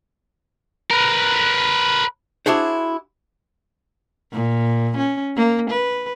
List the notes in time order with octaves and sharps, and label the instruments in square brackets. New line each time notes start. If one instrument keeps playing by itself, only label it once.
[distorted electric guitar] A#4 B4
[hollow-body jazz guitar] D4 E4 F#4 G#4 C5
[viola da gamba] A#2
C#4
A#3
B4